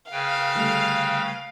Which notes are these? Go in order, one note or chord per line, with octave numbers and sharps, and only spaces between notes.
C#3 B4 F5 G5
D3 G3 A3